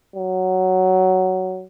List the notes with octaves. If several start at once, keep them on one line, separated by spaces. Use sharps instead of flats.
F#3